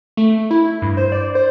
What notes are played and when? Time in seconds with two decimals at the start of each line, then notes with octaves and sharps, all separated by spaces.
0.17 A3
0.51 E4
0.82 G2
0.97 C5
1.12 D5
1.35 C5